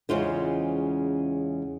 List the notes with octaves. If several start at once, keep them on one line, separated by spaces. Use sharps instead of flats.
E2 C#3 G#3 F4 C5